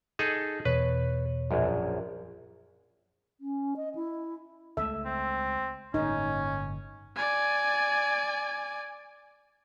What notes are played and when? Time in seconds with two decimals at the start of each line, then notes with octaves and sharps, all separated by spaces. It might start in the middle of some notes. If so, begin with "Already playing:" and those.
0.19 D#4 G#4 A4
0.65 E2 B2 B4 C#5
1.51 A#1 F#2
3.41 C#4
3.76 D#5
3.95 E4
4.77 C#2 G#3 A3 A4 E5
5.05 C4
5.94 G1 A2 A#3 C#4 D#4
7.16 D5 G#5